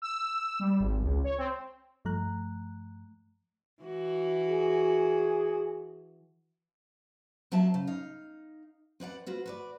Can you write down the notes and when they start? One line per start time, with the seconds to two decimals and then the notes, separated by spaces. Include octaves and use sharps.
0.02 E6
0.59 G3
0.79 G#1
1.03 C#2
1.24 C#5
1.38 C4
2.05 G2 F3 A3 A#5 F#6
3.83 E3 F#4
4.48 G#4
7.52 F#3 C4 F4 E5 A5
7.74 C#3
7.87 D#4 F5
9.00 C4 B4 D5 F#5
9.26 C4 F4 F#4 B4
9.46 F#4 B4 D5